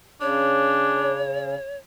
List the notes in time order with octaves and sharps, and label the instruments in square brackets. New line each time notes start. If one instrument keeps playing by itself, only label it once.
[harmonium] C#3 [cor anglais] D4 [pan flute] C#5